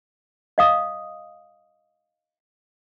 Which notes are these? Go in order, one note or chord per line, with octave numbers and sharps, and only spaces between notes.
D#5 F5 D#6